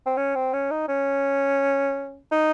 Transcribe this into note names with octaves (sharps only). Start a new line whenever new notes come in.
C4
C#4
C4
C#4
D#4
C#4
D#4